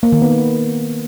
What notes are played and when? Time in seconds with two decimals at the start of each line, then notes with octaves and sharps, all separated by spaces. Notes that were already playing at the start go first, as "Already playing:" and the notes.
0.03 A#3
0.12 D#3
0.22 B3